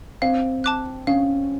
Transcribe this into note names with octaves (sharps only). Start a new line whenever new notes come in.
C4 F5
A5 D6 F#6
C#4 F5